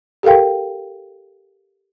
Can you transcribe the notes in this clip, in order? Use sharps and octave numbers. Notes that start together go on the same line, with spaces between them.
G4 A4 A#4 F5 G5